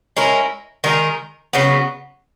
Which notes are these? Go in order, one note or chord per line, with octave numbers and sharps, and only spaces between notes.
G#3 C#4 E4 A#4
D#3 G#3 D#4 A#4
C#3 F#3 B3